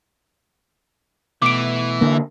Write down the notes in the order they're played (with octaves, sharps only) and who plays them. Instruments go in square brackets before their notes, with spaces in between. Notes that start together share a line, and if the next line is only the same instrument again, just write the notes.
[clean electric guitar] B2 A3 [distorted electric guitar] E3 [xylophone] D6 D7
[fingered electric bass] D3 A#3